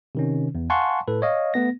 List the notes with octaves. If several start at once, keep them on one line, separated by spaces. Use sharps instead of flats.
C3 D#3 C#4
E2
F5 F#5 G#5 A5 C6 C#6
A2 A4 B4
C#5 D#5 F5
A3 B3 A#6